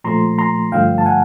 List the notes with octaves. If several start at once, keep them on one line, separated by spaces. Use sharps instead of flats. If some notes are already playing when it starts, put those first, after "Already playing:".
A#2 F3 A3 A#5 C6
A#5 C6
G2 D3 F3 A3 F5 G5
A5
F#5 G#5